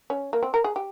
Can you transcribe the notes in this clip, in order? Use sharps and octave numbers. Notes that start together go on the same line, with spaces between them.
C#4
A#3
C4
A#4
G#4
G4